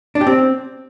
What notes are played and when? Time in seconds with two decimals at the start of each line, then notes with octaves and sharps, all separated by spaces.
0.15 D4
0.21 G4
0.27 C4